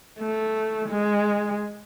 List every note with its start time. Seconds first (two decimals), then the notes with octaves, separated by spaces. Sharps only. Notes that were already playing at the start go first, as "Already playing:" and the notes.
0.19 A3
0.89 G#3